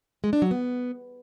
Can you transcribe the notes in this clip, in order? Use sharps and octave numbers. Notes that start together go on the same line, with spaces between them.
G#3
D4
F#3
B3